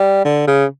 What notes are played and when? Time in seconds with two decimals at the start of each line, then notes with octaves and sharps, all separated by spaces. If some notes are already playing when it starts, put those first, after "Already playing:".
Already playing: G3
0.25 D3
0.47 C#3